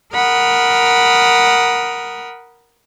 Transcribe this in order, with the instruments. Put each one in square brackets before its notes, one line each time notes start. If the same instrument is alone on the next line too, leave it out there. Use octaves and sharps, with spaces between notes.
[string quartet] A#4 F#5 B5 D#6 F6